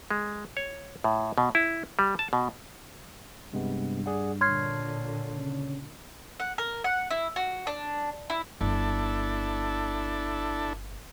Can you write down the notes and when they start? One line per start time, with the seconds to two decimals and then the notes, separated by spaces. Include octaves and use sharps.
0.11 G#3
0.57 C#5
1.04 A2
1.38 B2
1.55 E4
1.99 G3
2.19 A5
2.33 B2
3.53 G2 C3 G#3 B3
4.06 G#4 D5 F#5
4.41 A#2 D3 C#5 C6 F6 G#6 C7
5.37 C#3
6.40 F#5
6.58 A#4
6.84 F#5
7.11 E4
7.36 F#4
7.67 D4
8.30 E4
8.61 G1 D4 E4 A4